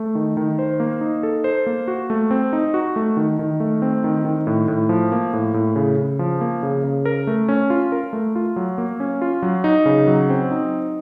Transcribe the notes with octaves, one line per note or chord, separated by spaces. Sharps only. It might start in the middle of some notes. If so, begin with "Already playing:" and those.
Already playing: A3
D#3
D#3
C5
A#3
D#4
A4
C5
A#3
F#4
A3
C4
D#4
F#4
A3
D#3
D#3
A3
C4
D#3
D#3
A2
A2
F3
A#3
A2
A2
C#3
C#3
F3
A#3
C#3
C#3
A#4
A3
C#4
F4
A#4
A3
F4
F#3
A#3
C#4
F4
F#3
D#4
C#3
F#3
C4
D#4